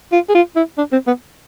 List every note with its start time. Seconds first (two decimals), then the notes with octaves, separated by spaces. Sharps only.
0.12 F4
0.29 G#4
0.35 F4
0.56 E4
0.78 D4
0.92 C4
1.07 B3